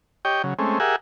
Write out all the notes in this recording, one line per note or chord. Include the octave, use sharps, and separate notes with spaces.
G4 C#5 D#5 G5
C#3 F#3
G#3 A3 C4 C#4
G4 G#4 A#4 E5 F#5 G#5